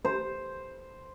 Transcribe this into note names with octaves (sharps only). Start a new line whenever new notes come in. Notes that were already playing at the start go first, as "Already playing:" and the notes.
C5